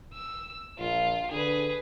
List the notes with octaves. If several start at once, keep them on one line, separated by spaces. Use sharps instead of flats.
E6
A#1 F4
D3 G#4 B4